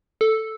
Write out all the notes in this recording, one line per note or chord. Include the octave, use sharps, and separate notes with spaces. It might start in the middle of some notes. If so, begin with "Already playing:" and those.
A4